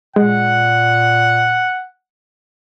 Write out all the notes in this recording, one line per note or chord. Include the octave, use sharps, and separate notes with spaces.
A#2 G#3 F#5